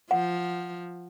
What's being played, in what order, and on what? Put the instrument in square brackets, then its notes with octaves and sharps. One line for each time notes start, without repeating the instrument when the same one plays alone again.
[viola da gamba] F3 [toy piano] F#5